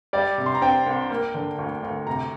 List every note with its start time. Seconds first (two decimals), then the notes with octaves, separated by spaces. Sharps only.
0.13 G3 D5
0.38 C3
0.46 C6
0.55 A#5
0.61 C4 G5
0.86 C2
1.11 A#3
1.34 D3
1.58 D2
1.83 D2
2.07 C3 A#5